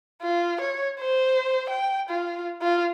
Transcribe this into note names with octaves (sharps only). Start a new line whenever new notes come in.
F4
C#5
C5
G5
F4
F4